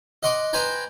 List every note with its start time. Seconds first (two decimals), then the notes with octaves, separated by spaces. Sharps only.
0.23 D#5 F#5 C6 D6
0.53 B4 C5 G5 G#5 A#5